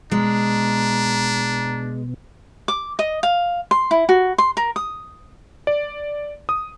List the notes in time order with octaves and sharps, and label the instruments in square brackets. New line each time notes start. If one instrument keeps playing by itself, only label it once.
[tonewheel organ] B2 [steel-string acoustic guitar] G#3 [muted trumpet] D4 [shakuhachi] A#5
[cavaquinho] D6
D#5
F5
C6
E4
F#4
C6
A#4
D#6
[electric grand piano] D5
D#6